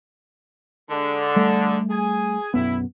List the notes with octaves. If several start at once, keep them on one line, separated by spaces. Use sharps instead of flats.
D3 G#3
G3 A3
G#4 G#5
B1 F#2 A2 B3 E4